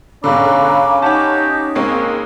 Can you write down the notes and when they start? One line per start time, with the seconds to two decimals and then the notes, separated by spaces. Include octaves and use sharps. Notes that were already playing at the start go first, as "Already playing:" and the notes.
0.24 G#2 B2 D3 C#4 F5 A#5 B5 D6
1.02 D#4 G4 C#5 F#5 A5
1.75 C#2 G#3 A#3 C4 C#5